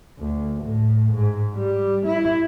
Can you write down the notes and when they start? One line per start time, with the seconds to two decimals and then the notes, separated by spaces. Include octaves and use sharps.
0.19 D2
0.64 A2
1.12 G#2
1.56 G3
2.06 E4